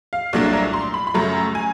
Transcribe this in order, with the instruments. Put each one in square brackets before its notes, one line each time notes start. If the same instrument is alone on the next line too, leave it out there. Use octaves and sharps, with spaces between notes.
[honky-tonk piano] F5
C2 A#2 F#3 A3 D4
A#5
C6
B5
B5
F#2 C#3 F#3 A3 A#5
G#5